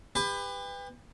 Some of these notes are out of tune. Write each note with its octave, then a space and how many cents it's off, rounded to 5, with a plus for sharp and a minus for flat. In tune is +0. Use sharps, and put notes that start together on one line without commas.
G4 +35 B4 +15